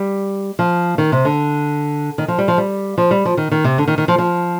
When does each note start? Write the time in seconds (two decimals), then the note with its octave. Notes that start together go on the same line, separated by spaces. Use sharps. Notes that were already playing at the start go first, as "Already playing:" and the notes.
Already playing: G3
0.59 F3
0.98 D#3
1.12 C3
1.25 D3
2.18 D#3
2.28 F3
2.38 G3
2.48 F3
2.58 G3
2.98 F3
3.11 G3
3.25 F3
3.37 D#3
3.51 D#3
3.64 C3
3.78 D3
3.88 D#3
3.98 D#3
4.08 F3
4.18 F3